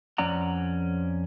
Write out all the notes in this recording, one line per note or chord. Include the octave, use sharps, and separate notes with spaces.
F2 C#4 D5 F#5 A#5